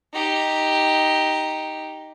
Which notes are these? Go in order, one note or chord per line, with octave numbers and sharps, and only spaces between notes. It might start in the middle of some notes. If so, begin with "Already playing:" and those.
D#4 G4